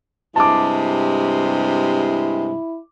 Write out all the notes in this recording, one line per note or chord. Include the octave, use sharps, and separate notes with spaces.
G2 C3 G#3 E4 A5 D6